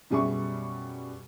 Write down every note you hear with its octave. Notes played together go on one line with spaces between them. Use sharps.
F#2 B2 G3 G#4 E5 C#6